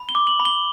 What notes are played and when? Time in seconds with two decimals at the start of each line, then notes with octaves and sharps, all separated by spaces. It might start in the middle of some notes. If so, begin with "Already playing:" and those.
Already playing: B5
0.09 G7
0.15 D6
0.27 F#7
0.40 B5
0.45 G7